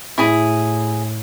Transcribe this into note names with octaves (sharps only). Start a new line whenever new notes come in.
A2 E4 G#4